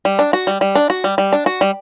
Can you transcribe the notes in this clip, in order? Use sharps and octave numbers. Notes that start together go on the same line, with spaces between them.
G3
D4
F#4
G3
G3
D4
F#4
G3
G3
D4
F#4
G3